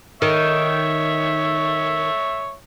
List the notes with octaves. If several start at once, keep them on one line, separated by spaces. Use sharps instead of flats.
D#3 C#5 E5